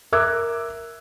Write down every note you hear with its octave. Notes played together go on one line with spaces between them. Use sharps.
A#4 E5 D6 E6 F#6 G#6